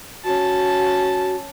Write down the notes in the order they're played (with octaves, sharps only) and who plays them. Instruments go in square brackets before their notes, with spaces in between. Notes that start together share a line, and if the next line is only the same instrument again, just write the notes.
[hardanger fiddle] C#4 A5 [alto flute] F#4